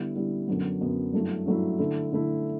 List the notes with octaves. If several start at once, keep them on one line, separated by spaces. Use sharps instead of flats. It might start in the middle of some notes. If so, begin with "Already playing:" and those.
Already playing: D3 G3 B3 E4
D3 G3 B3 E4
F#2 D3 F#3 B3
F#2 D3 F#3 B3
G2 F#3 A3 E4
G2 F#3 A3 E4
D3 A3 E4
D3 A3 E4